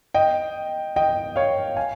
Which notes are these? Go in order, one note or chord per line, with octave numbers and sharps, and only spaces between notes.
D#5 G5
D#5 G5
C#5 F5
F5 G#5